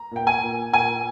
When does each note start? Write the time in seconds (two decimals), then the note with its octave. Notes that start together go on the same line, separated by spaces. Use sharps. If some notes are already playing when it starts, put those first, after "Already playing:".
Already playing: A#5
0.11 A#2 G5
0.27 G#5
0.42 A#2
0.73 A#2 G#5